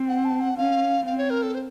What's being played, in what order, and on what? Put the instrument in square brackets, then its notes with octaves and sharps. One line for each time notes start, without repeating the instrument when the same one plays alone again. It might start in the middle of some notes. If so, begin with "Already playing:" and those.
Already playing: [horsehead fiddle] C4
[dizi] F#5
A5
F#5
[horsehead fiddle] C#4 [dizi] F5
[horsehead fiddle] C4 [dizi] F5
[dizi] C#5
A#4
A4
C5